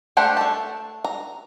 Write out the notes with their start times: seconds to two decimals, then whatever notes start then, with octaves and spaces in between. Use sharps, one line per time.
0.17 A3 D4 G4 C5 F#5
0.37 A3 A5
1.04 A#5